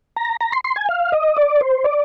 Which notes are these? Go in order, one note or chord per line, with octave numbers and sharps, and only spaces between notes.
A#5
A#5
C6
C6
G#5
F5
D#5
D5
C5
D5